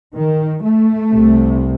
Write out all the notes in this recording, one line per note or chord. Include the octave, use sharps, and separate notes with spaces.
D#3
A3
C2 C3